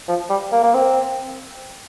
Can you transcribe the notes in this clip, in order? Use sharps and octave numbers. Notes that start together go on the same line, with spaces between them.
F3
G3
A#3
A#3
C4